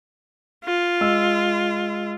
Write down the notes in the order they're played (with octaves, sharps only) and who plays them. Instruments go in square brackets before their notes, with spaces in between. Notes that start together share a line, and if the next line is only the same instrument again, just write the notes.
[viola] F4
[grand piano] G#3 E6